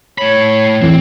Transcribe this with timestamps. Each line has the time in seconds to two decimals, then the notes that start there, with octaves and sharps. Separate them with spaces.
0.18 A2 C#5 B5
0.82 E2 A2 E3 C4